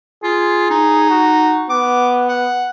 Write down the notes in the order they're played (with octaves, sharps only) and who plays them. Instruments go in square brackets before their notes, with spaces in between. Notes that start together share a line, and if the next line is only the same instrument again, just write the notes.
[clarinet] F4 [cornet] G#4
[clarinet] D#4
[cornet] F#4
[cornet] B3 [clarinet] D6
[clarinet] F#5